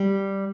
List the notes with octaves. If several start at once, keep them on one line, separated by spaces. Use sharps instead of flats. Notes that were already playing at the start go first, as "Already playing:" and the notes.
Already playing: G3